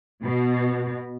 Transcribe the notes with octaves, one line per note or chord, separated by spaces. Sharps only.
B2